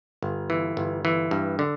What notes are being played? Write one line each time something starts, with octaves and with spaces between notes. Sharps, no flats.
G1
E3
G1
E3
G2
D3